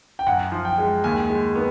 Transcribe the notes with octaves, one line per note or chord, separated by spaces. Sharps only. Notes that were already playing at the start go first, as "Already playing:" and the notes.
G5
F#2 F#5
F3
G5
G#3
D#2 G#5
G#3
B3